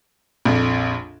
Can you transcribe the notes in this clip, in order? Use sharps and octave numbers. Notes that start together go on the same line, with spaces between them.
A#1 F2